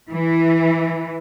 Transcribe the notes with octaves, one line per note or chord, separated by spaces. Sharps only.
E3